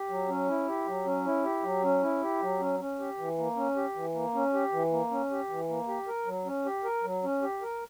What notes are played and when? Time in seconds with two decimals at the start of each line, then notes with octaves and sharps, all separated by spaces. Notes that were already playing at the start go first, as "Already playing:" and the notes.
Already playing: G4
0.09 F#3
0.29 C#4
0.49 E4
0.68 G4
0.87 F#3
1.06 C#4
1.25 E4
1.44 G4
1.63 F#3
1.83 C#4
2.03 E4
2.22 G4
2.42 F#3
2.60 C#4
2.80 C#4
2.99 G4
3.18 E3
3.38 A#3
3.56 C#4
3.76 G4
3.96 E3
4.14 A#3
4.35 C#4
4.53 G4
4.72 E3
4.92 A#3
5.11 C#4
5.31 G4
5.50 E3
5.69 A#3
5.88 G4
6.07 A#4
6.26 F#3
6.45 C#4
6.65 G4
6.84 A#4
7.03 F#3
7.23 C#4
7.42 G4
7.62 A#4